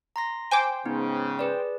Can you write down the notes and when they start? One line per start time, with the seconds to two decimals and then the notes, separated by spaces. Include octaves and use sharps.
0.16 A#5 C6 A#6
0.51 C5 G5 G#5 D6
0.86 G#2 C#3 B3 D#4
1.39 G#4 B4 D5